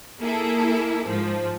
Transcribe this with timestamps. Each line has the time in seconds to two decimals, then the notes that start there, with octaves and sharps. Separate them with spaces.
0.21 A#3 E4 G#4 A4
1.08 G#2 F3